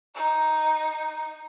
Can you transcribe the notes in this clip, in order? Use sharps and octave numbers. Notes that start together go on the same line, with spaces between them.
D#4